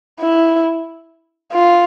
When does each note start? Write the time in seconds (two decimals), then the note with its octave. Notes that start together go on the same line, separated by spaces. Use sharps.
0.21 E4
1.53 F4